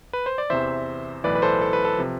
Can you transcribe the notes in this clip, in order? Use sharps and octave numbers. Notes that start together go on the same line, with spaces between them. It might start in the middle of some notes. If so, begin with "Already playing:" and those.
B4
C5
D5
E2 C3 E3 C5 E5
B1 A2 E3 B4 D5
B4
A4 C5
A4
B4
A4
C3 F3